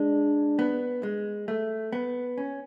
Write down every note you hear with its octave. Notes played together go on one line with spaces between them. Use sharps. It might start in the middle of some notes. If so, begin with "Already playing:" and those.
Already playing: G#3 D4
B3
G#3
A3
B3
C#4